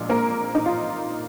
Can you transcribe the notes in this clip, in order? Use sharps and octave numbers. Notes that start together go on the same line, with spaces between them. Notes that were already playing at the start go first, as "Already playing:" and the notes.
Already playing: A#1 A#2 G#3
A#3 A#4
D#4
F4